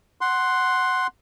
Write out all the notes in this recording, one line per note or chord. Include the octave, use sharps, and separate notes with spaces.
F#5 C6